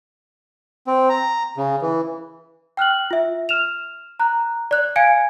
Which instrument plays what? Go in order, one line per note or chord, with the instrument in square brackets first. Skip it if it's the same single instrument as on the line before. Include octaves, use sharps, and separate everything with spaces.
[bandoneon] C4
A#5
C#3
E3
[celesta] G5 F6 F#6 F#7
F4 E5
F6 E7 F7
A#5 F#6
D5 F#6
F5 G#5 G#6 C#7 D7